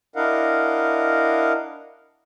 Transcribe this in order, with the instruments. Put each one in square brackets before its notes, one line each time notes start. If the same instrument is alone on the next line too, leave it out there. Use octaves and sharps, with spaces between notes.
[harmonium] D4 E4 A#4 D#5 F5 F#5